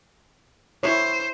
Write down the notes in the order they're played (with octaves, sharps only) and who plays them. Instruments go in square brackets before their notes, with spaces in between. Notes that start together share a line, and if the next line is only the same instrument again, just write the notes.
[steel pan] E4 C#5 [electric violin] C5